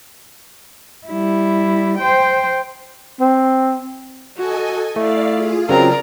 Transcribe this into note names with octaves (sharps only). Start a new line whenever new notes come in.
G3 E4
C5 G5
C4
F#4 A4 D#5 G#5
A3 E4 D5 F5
F4 G#4
C#3 F#3 C4 A#4 D5